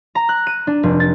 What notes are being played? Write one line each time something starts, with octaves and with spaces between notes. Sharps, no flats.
A#5
F#6
D#7
D4
F1
A6